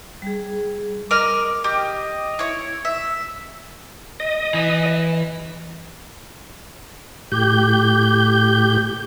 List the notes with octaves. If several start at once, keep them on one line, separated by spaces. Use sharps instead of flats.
G3 G#4
A#4 D#5 D6 F6
G4 D#5
E4 C#5
E5
D#5
E3
A2 G4 G6